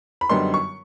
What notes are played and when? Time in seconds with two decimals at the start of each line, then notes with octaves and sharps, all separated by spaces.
0.21 B5
0.29 F#2 D3 G3 B3 D#4 C6
0.54 C#6